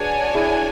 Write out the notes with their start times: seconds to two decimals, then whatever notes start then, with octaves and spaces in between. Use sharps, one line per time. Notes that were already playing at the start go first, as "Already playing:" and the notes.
Already playing: D4 F#4 G#4 B4 C#5 G#5
0.35 E4 G#4